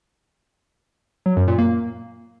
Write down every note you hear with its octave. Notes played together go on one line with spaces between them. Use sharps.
F#3
F#2
A#2
A#3